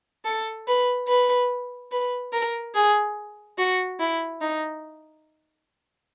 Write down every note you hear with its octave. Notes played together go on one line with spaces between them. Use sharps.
A4
B4
B4
B4
A#4
G#4
F#4
E4
D#4